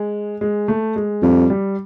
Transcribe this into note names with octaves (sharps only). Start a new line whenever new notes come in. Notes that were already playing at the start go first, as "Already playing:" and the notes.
Already playing: G#3
G#3
A3
G#3
F2 G3
G3